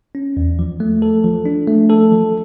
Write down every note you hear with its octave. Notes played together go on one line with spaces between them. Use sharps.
C#4
E2
F3
A3
A4
F3
D4
A3
A4
F3